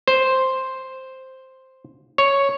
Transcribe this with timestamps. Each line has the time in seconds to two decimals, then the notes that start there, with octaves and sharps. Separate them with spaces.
0.08 C5
2.18 C#5